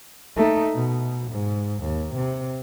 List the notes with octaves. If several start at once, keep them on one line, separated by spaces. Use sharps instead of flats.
A3 D#4
B2
G#2
D#2
C3